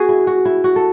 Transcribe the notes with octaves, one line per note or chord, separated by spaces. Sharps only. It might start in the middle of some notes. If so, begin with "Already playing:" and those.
Already playing: B3 F#4 G#4
E4
F#4
E4
F#4
A4